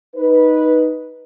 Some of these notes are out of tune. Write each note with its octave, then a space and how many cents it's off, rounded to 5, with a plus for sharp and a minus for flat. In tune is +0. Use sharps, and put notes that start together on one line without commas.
D#4 +0 B4 -10